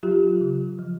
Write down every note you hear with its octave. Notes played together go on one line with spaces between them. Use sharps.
F#3 F4 G4
C#3
F3